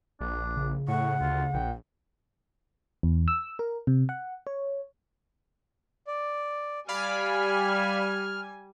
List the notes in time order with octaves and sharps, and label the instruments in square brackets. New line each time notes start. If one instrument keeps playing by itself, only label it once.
[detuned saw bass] A#1 [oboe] D4
[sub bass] C#3
[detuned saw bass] A2 [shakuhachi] F#5 [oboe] C#6
[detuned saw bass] D2 [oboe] F4
[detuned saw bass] A#1 [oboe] G5
[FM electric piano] E2
E6
A#4
C3
F#5
C#5
[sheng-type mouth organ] D5
[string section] G3 G#5 [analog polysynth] D5 F5 B5 [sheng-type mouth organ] F6